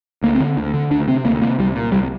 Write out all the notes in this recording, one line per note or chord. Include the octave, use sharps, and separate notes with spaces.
D2 A#3
C4
D3
D2
D3
D2 D4
C3 C4
D2 A#3
C3 A#3
C2 G3
A#2
C2 G3